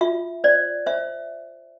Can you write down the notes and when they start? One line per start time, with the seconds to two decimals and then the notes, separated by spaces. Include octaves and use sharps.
0.01 F4 E5
0.44 C5 D5
0.86 C5 E5